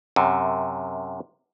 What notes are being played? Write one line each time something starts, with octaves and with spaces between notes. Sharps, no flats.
F#2 C3